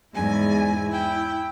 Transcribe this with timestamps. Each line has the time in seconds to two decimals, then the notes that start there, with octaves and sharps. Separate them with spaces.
0.14 E2 G#2 E4 G#5
0.87 E4 G5